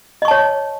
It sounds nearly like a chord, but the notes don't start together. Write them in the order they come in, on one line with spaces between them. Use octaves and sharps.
D#5 C#6 A5 C#5